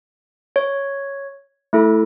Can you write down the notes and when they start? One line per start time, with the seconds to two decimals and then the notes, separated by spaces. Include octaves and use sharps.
0.56 C#5
1.73 A3 E4 A4